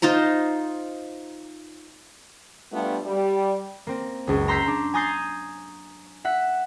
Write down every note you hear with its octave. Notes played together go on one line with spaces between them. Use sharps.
D#4 F4 C5 A#5
G3 A3 B3 D4 F4
G3
A#3 C4
F#1 C#2
A#5 C6 E6 G6 B6 C7
D4
G#5 A#5 D#6 G6 A6 C7
E5 F#5 B6